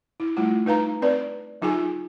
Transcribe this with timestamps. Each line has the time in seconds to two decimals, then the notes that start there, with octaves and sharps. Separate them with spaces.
0.20 E4
0.37 G3 A3 E4 F4
0.66 D#4 B4 F5 A#5
1.02 C4 B4 D5
1.62 F#3 D#4 F4 G#4 G#5